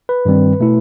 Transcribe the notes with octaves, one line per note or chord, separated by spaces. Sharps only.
B4
G2 D#3 G3 C4
B2 A3 E4